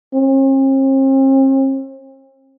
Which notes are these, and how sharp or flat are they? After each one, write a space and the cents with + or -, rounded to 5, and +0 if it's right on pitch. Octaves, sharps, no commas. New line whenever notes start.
C4 +45